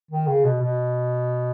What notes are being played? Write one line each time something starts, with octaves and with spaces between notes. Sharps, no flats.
D#3
C#3
B2
B2